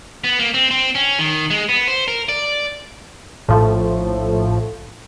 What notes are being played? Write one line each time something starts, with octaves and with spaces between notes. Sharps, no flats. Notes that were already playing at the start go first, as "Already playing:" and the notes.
B3
A#3
C4
C4
C#4
D#3
G#3
B3
C5
A#4
D5
A#1 A2 F3 A3